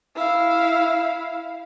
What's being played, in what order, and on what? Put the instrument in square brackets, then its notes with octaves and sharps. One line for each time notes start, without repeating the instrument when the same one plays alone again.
[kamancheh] E4 F5